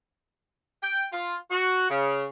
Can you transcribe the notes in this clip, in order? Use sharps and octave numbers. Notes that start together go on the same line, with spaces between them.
G5
F4
F#4
C#3